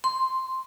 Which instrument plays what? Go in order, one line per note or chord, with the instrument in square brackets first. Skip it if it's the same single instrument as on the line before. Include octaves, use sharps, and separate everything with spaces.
[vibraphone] C6